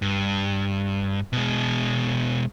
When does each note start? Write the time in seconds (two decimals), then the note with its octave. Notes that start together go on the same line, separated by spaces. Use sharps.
0.02 G2
1.33 B2 G#3